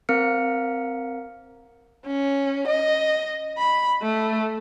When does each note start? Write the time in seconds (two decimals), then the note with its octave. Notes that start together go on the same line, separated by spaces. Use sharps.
0.09 C4 A#4 F5 F6 C#7
2.06 C#4
2.67 D#5
3.58 B5
4.02 A3